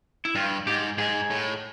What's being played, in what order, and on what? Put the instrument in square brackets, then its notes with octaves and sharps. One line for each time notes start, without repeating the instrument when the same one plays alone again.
[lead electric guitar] E4
[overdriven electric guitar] G2 [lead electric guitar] F4
[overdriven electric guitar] G#2 [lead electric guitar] G4
[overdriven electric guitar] G#2 [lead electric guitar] G#4
[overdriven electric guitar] A2